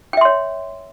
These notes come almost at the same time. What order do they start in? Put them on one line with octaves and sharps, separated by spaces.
G5 E5 C6 C#5